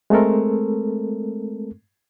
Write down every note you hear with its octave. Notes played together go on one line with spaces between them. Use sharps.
G#3 A3 C4 A4 A#4